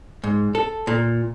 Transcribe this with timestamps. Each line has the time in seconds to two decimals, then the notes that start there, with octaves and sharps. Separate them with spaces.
0.24 G#2
0.55 A4
0.87 A#2